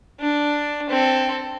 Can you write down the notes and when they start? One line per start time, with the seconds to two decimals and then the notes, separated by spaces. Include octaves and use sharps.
0.20 D4
0.90 C4 A4